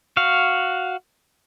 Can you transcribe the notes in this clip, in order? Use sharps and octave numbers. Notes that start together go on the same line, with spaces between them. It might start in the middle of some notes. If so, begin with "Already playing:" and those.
F#4 F5